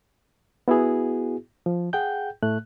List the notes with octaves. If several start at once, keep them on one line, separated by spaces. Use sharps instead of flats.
B3 E4 F#4 G#4
F3
G#4 F#5 G5 G6
A2 A3 F#6